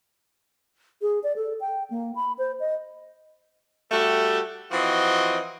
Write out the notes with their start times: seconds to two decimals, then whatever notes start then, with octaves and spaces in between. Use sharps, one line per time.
1.02 G#4
1.23 D5
1.36 A4
1.61 G5
1.91 A#3
2.15 B5
2.38 C5
2.60 D#5
3.92 G3 A3 F#4 G4 A4
4.72 E3 F3 C4 F#4 D#5